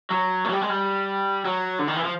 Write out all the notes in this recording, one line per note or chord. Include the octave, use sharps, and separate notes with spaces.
F#3
A3
F#3
G3
G#3
G3
F#3
D3
D#3
E3
F3